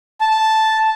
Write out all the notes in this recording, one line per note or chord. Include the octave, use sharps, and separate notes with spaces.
A5